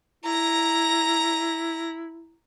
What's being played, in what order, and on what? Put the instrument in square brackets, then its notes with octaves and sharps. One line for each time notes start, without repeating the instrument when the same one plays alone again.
[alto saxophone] E4 [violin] A#5 A#6